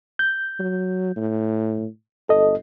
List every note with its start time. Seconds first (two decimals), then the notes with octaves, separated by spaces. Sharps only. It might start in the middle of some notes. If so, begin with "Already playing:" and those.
0.19 G6
0.60 F#3
1.16 A2
2.29 G1 A4 D#5